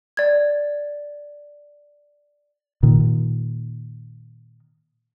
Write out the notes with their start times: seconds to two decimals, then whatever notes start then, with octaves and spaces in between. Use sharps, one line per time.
0.17 D5 G#6
2.83 A#2 D#3